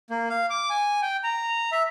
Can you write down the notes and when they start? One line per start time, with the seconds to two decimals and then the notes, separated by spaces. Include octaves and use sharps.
0.10 A#3
0.30 F5
0.50 D6
0.70 G#5
1.02 G5
1.24 A#5
1.72 E5